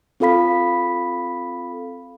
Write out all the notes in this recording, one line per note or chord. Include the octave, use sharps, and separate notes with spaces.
C4 F4 A4 F5 B5 B6